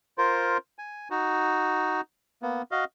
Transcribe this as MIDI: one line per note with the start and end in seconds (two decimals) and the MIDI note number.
0.18 0.57 65
0.18 0.57 70
0.18 0.57 72
0.79 1.08 80
1.10 2.01 63
1.10 2.01 66
2.42 2.62 58
2.42 2.62 59
2.71 2.84 66
2.71 2.84 75
2.71 2.84 77